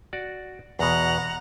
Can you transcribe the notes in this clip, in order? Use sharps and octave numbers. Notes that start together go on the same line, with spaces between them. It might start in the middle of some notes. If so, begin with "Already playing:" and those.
F#4 D5
E2 B2 F#5 A#5